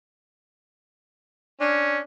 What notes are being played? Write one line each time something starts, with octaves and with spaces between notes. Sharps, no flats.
C#4 D4